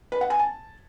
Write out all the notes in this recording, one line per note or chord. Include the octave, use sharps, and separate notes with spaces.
B4
F#5
G#5
A5